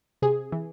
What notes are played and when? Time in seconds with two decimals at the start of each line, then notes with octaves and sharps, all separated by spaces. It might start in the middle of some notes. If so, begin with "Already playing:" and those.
0.22 C3 G#4
0.52 E3